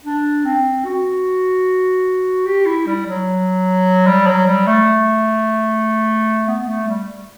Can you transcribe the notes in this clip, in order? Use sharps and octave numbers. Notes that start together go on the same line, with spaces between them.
D4
C4
F#4
G4
E4
G3
F#3
G3
F#3
G3
A3
B3
A3
G3